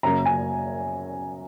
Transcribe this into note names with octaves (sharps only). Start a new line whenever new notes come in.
F#2 C#3 F#3 A#3 A#5
G#5